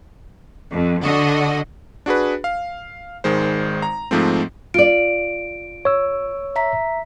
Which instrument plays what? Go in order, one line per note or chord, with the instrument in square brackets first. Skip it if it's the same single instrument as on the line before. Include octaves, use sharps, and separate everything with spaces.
[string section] F2
D3 F#4 D#5
[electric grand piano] D4 F#4 G#4 B4
F5
G#1 D#3 G#3 C5
A#5
G#2 F3 A3 C4
[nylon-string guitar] F4 D5 [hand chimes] D7
[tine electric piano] C#5 E6
[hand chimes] E5 A#5 B6